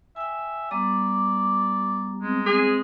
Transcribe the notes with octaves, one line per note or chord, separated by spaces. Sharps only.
E5 G5 G#5
G3 B3 G4 D5 A#5
G#3 C4
C4 G#4